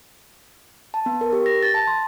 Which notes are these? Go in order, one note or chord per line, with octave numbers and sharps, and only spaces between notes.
A5
B3
A#4
G4
A#6
A6
A5
C6